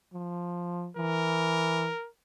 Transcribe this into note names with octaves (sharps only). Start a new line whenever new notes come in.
F3
E3 A#4